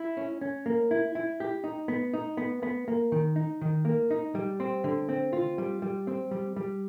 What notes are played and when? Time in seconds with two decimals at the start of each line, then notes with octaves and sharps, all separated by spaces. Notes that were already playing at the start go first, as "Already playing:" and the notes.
Already playing: E4
0.17 C#4
0.41 C#4
0.66 A#3
0.91 E4
1.15 E4
1.40 G4
1.64 D#4
1.88 B3
2.13 D#4
2.37 B3
2.63 B3
2.88 A#3
3.12 D#3
3.36 D#4
3.61 D#3
3.85 A#3
4.11 D#4
4.35 G3
4.60 C4
4.84 D3
5.09 C4
5.33 F4
5.58 G3
5.82 G3
6.07 C4
6.31 G3
6.56 G3